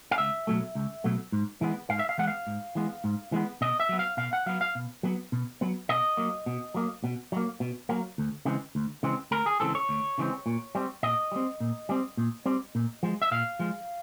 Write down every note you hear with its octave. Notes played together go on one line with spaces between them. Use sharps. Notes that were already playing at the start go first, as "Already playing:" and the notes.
F5
C#2 E5
B2 F#3 A3
C#2
B2 F#3 A3
G#2
E3 G#3 B3
G#2 F5
E5
F5
E3 G#3 B3 F#5
F5
G#2
E3 G#3 B3
G#2
E3 G#3 B3
B2 D#5
E5
F#3 B3
F5
B2 F5
F#5
F#3 B3 F5
F5
B2
F#3 B3
B2
F#3 B3
B2 D#5
F#3 A#3
B2
F#3 A#3
B2
F#3 A#3
B2
F#3 A#3
D2
C#3 E3 G#3 C4
D2
C#3 E3 G#3 C4
D2 A#4
G#4
C#3 E3 G#3 C4 A4
C#5
D2
C#3 E3 G#3 C4
A#2
G3 C4
A#2 D#5
G3 C4
A#2
G3 C4
A#2
G3 C4
A#2
F3 G#3
E5
A#2 F5
F3 G#3